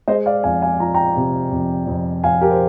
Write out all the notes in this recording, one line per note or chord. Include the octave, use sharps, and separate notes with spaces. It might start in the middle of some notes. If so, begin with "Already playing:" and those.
G#3 C5 D#5
D5 F5
F2 F5 G#5
F5 G#5
F3 A#5
G5 A#5
C3
F2
F2
F2 F5 G#5
G4 A#4
C5